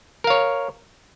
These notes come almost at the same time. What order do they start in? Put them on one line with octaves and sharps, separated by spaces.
A#4 F5 C#5